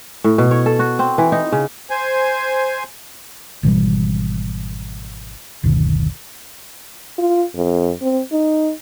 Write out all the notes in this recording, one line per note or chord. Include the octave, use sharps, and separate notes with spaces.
A2
B2
C#5
A4
F#4
C4
E3
D#4
C#3
C5 G#5
G#1 B2 E3 G3
F#1 D2 B2 D#3
F4
F2
C4
D#4